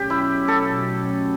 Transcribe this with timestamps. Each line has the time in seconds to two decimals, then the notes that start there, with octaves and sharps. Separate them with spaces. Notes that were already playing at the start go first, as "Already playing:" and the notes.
Already playing: B2 F#3 A3 C#4 G4
0.10 E4
0.48 A4